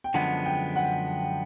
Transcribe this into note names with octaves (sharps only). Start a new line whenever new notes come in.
G5
F#2 D3 F3 G#3 B3 F#5
G5
F#5